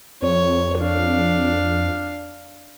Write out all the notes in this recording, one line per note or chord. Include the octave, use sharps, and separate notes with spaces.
F2 C#5
D4 F5